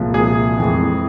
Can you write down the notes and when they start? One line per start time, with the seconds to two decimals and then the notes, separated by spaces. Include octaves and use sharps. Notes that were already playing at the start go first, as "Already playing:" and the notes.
Already playing: C2 A#2 F3 G#3
0.14 G#4
0.58 F2 E3 G#3